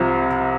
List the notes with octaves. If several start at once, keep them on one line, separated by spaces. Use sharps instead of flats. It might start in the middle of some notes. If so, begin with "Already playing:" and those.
Already playing: C2 C3 F3